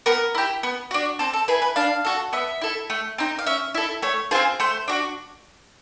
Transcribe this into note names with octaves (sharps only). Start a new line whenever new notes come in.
B3 A#4
E4 G4
B3
D4 F#4
C4 A4
A4
E4 G#4 B4
B4
D4 F5
F#4 A4
B3 E5
E4 A4
A3
C4 D#4
F5
C#4 E5
E4 A4 E5
A3 C#5
C4 F4 G#4 C5
A3 C5
D4 F#4